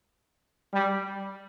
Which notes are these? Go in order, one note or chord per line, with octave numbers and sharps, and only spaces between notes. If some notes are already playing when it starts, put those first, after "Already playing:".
G3